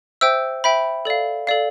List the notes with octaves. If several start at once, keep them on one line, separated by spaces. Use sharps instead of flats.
C5 E5 G5 E6
C5 E5 G5 B5
A4 D5 F5
A4 D5 F5